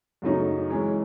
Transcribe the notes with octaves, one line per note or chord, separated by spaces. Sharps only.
F#2 C#3 F#3 A3 D#4
E3 G#3 C#4